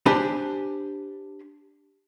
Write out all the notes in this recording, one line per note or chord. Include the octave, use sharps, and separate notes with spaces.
D4 G4 C5 G#5 B5